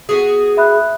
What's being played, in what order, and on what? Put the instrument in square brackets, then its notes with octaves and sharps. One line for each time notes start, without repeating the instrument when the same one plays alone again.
[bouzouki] B3 F#4 G#4
[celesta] E5 B5 F#6